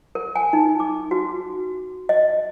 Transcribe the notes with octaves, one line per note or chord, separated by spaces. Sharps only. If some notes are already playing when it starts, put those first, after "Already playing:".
A#4
G#5
D#4
D6
F#4
D#5